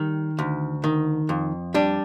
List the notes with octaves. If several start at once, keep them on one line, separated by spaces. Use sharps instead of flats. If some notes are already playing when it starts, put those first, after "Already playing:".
Already playing: D#3 G3
D2
D#3
F2
G3 D4